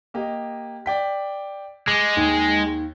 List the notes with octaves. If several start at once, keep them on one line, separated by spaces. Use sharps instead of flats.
A#3 G4 D#5
D5 G5 B6
G#3 D6
D#2 D#3